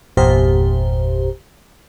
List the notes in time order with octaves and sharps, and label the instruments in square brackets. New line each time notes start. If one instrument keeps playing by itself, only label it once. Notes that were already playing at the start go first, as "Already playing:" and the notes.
[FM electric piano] G1 E2 A#2 G4 C5